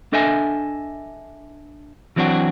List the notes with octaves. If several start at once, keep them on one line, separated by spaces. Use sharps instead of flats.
D4 A4 D#5 E5 G#5
E3 F#3 C4 D4 F#4